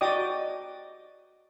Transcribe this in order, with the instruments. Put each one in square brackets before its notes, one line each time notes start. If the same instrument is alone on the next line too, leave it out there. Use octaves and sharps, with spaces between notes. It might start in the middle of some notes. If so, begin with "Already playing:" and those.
[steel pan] F#4 D5 D#5 G5 D6 D#6